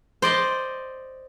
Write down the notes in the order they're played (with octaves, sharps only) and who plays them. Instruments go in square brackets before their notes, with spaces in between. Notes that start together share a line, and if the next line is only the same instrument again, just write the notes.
[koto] C5 D5 D#5